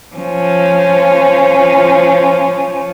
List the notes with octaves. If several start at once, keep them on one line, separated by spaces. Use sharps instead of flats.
F3 C#4